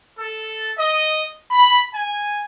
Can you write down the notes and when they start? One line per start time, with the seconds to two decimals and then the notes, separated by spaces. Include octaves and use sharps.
0.19 A4
0.78 D#5
1.51 B5
1.94 G#5